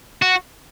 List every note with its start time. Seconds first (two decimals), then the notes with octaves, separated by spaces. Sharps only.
0.22 F#4